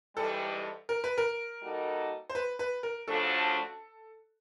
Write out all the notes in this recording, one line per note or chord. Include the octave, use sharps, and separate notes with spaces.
G#2 E3 G3 A4
A#4
B4
A#4
G3 A#3 D#4 F#4 A4
C5
B4
B4
A#4
C#3 F3 A3 D4 F#4 A4